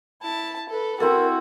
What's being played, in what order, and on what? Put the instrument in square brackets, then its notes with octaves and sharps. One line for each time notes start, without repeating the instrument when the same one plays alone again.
[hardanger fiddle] E4 A5
A4 B4
[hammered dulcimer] C4 E4 A4 [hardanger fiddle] F#4 [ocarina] A#4